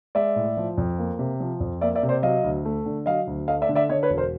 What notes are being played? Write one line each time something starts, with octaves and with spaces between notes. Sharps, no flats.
G#3 D5 E5
A2
F3
F2
A#3
C3
F3
F2
A#3 D5 E5
D5 E5
C3
C5 D5
F#3 D#5 F5
D2
A3
D3
F#3 D#5 F5
D2
A3 D#5 F5
D5 E5
D3
D5 E5
D3 C#5 D#5
B4 C#5
E1
A#4 C5